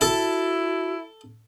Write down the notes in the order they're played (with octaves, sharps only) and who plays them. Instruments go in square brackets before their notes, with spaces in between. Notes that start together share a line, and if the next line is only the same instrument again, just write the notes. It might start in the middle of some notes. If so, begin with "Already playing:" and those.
[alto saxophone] E4 [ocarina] F#4 [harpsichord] A4 A5